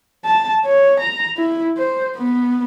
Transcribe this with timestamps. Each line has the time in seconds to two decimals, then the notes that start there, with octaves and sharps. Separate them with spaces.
0.25 A5
0.65 C#5
1.00 A#5
1.37 E4
1.78 C5
2.17 B3